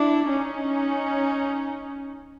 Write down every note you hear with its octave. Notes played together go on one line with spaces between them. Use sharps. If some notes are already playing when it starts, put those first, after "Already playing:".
Already playing: D4 E4
C#4 D#4